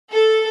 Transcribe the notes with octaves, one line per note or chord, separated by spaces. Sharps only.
A4